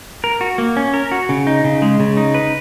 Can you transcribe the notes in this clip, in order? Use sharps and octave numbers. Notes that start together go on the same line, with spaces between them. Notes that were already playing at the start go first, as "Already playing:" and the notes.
A#4
F#4
A#3
C#4
A#4
F#4
C#3
D#4
C#3
G#3
C#3
D#4
B4